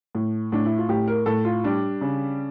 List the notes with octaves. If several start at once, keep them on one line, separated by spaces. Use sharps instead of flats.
A2
A2 D4
E4
F4
A2 G4
A#4
A2 A4
F4
G3 D4
C#3